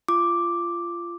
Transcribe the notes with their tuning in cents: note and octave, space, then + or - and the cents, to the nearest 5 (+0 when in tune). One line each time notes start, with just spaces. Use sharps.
F4 -20 D6 +0